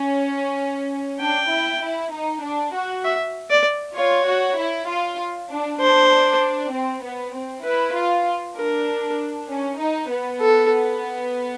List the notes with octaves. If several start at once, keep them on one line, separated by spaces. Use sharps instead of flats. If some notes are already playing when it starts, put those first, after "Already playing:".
Already playing: C#4
D4 G5
E4
E4
D#4
D4
F#4
E5
D5
F4 C#5
F#4
E4
F4
D4
D4 C5
C4
B3
C4
E4 B4
F4
D4 A#4
C#4
D#4
B3
A4